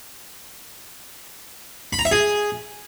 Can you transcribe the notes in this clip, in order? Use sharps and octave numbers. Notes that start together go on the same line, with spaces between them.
B5
A#5
E5
G#4